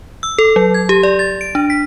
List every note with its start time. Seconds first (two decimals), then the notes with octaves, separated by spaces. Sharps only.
0.23 E6
0.38 A4
0.56 F#3
0.74 G#6
0.89 G4
1.03 D5
1.19 A6
1.41 D7
1.55 D4
1.70 B6